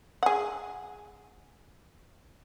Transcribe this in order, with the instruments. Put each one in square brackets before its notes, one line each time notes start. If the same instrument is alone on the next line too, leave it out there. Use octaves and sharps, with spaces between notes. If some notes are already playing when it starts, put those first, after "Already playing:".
[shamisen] G#4 F#5